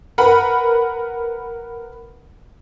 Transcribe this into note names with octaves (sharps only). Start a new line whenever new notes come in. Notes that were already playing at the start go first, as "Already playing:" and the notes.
A#4 B4 F#5 B5